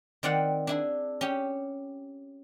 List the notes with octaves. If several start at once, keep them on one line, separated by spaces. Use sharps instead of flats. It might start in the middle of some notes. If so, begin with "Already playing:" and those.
D#3 C4 D5 F5 F#5
D4 E4 G#4
C#4 G4